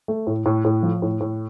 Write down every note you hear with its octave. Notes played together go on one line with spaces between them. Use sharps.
A3
A2
A2
A2
F3
A2
A2